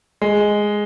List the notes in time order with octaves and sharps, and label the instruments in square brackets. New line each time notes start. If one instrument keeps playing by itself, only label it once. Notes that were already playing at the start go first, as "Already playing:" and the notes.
[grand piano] G#3